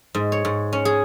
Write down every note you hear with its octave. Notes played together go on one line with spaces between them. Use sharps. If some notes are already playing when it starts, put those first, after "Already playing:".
G#2
C#5
G#2
C#4
G#4